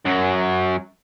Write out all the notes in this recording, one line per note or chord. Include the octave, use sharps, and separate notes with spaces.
F#2 F#3